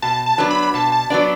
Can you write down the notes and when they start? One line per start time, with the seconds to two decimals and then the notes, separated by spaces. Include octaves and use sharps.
0.02 B2 A5
0.26 A5
0.38 F#3 B3 D4
0.51 B5
0.74 B2 A5
0.92 A5
1.10 F#3 B3 D4 D5